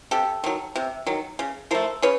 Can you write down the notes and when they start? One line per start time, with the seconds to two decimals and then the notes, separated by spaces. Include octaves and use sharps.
0.11 C3 G4 A4
0.44 D#3 F#3
0.76 C3
1.07 D#3 F#3
1.39 C#3
1.71 F3 A3 A#4 C5
2.02 C#3 B4 C#5